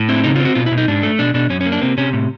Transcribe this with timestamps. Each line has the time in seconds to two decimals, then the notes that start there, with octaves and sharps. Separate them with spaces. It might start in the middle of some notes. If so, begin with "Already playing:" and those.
Already playing: A2
0.09 C4 E4
0.24 C#3 D#4
0.36 F4
0.40 C4
0.45 F#4
0.55 B2 F4
0.66 E4
0.72 B2
0.78 D#4
0.88 G#2 D4
1.03 A3
1.19 B2 D4
1.34 B2 D4
1.50 F#2 C#4
1.61 C#4
1.66 A#3
1.72 D4
1.81 C3 C4
1.98 C3 C#4
2.13 A2